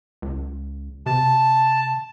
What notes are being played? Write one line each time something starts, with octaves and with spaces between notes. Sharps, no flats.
C#2
C3 A5